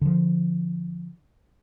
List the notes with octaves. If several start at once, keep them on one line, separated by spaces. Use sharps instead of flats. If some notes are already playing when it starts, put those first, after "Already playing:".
D3 F3